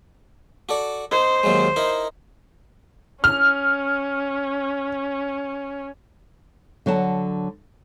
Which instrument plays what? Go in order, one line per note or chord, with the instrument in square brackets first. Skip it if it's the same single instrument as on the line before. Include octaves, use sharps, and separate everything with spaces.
[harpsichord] F#4 A4 D5
[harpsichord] D#4 [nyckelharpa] C5
[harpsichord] D#2 F#3 G#3
D#4 E4 A#4
[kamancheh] C#4 [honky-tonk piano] F6
[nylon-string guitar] D3 F#3 F#5 A5